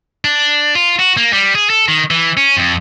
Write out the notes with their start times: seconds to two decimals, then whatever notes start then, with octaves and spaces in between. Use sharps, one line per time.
0.25 D4
0.75 F4
0.99 F#4
1.17 A#3
1.33 G3
1.55 G#4
1.70 A4
1.88 D#3
2.11 E3
2.37 C#4
2.57 F2